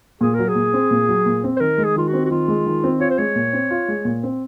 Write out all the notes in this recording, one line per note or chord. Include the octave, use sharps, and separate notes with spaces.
A#2 G#4
F#3 A#4
G#4
A#2
C4
A#2
F#3
A#2
C4
C5
D#3 A#4
G#3
G#4
D#3 F4
F#4
C4
F#4
D#3 F4
G#3
D#3
C4
F4 C#5
C5
G#3 C#5
A#2
C4
F4
G#3
A#2
C4